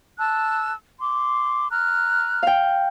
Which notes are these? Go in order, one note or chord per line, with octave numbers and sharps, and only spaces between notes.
A5 E6 F#6
C6 D6
A#5 F6 F#6
F5 G5